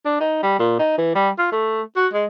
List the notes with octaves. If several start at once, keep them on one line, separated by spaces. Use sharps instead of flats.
D4
D#4
G3
A#2
D#4
E3
G3
F4
A3
F#4
G#3